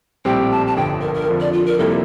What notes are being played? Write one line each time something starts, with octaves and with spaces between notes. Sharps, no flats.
A#1 A2 G3 C4 G4 G5
A5
A5
G1 F2 D3 G5
A#4
A#4
F2 D3 F3
D5
F4
A#4
F2 C3 G3 A#3 E4 A4